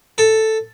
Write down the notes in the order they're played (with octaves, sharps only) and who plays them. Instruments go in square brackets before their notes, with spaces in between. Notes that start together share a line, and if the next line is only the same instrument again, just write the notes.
[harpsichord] A4